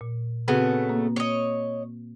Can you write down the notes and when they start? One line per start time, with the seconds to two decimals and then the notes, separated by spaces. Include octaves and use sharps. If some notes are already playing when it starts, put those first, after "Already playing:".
0.01 A#2
0.48 C#3 A3 B3 C4 F#4 B4
0.89 A#3
1.16 C#5 D#5